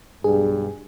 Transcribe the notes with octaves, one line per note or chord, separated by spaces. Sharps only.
B1 G2 G#4